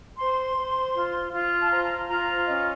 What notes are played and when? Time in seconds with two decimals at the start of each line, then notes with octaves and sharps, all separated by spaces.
0.18 C5 C6
0.57 C5
0.94 F4
1.32 F4
1.61 A5
1.70 C5 A#5
2.09 F4 A#5
2.47 C#4 D#5